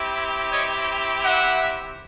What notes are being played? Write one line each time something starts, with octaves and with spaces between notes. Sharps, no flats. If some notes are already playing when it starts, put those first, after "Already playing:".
Already playing: C4 E4 G4
C#5 D#5
E5 F#5